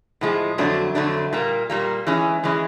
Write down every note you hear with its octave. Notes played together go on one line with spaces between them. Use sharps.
A2 F3 G#3
F2 D3 F#3 A3 D4
F2 D3 F#3 A3 D4
A#2 G3 A#3
A#2 G3 A#3
E3 G#3 C#4
E3 G#3 C#4